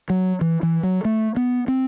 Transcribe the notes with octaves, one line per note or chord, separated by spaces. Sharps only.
F#3
E3
E3
F#3
A3
B3
C4